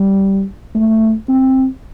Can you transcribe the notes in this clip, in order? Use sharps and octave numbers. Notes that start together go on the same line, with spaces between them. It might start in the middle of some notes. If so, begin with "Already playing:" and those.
Already playing: G3
A3
C4